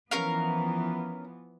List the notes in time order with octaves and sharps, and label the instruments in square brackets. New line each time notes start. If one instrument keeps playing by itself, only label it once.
[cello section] E3 F3 B3 [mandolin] C#4 A#4 F5